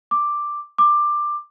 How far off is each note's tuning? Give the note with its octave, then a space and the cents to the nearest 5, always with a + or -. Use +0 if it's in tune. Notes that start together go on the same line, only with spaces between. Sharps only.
D6 +5
D6 +15